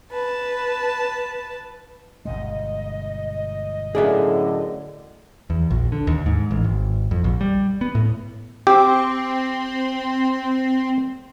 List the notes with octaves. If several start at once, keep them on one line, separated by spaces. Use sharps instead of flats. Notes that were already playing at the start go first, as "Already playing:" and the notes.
B4 A5
G1 B2 G#3 D#5
F#2 A2 D3 G#4 D5 E5
E2
A#1
D3
D#2
G#2
A1
G#1
F2
A#1
G3
B3
A2
C4 G4